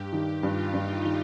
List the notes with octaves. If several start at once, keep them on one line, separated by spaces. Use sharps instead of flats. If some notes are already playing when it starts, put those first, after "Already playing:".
Already playing: G2 G4
D#3 G4
G2 F4
G2 D#4
D#3